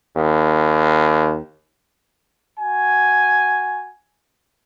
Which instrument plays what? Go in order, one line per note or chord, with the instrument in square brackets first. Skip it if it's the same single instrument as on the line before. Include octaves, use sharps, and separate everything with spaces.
[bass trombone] D#2
[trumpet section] F#4 G#5